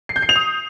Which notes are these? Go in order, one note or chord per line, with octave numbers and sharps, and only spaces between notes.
C7
G6
C7
F7
D#6